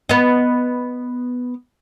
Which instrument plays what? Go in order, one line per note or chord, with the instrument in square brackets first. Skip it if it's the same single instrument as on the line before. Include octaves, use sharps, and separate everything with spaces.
[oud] B3 D#5